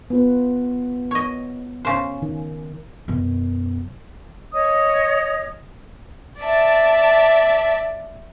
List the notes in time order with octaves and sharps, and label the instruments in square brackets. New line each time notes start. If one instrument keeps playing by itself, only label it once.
[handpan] B3 F4 B4
[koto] C#5 D#5
C#3 C5
[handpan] D#3
[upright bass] F#2 B2
[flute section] C#5 D#5 D#6
[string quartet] D5 E5 A5